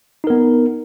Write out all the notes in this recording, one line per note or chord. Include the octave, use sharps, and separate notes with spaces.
B3 D#4 A#4